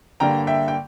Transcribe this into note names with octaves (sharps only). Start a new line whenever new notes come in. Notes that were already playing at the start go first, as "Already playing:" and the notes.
G2 D3 G3 A#3 G5 A#5
E5 G5
G5